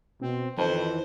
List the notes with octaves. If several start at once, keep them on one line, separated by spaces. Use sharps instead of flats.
B2 C4
F2 D#3 E3 C5